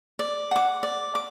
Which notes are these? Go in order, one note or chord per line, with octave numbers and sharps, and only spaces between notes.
D5
F#5 D6
D5
D6